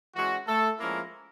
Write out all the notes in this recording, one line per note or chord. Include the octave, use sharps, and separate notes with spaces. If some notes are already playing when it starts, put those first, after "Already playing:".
E3 G#3 C#4 F#4
A3 A4
F3 G#3 A#3 C#4 E4 A#4